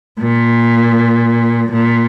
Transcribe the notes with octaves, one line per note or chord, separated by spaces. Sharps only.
A#2
A#2